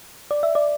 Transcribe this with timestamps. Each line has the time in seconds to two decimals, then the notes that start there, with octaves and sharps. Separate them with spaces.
0.31 D5
0.43 E5
0.55 D5